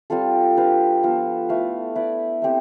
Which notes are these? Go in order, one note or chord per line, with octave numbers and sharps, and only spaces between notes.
G3 C4 F4 A4
D4 G4 B4 F5
F3 B3 F4 A4
A3 E4 B4 F5
E4 B4 D5
A3 C4 G4